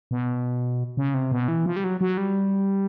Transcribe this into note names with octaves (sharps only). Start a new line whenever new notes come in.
B2
C#3
C3
B2
E3
F3
G3
F#3
F#3
G3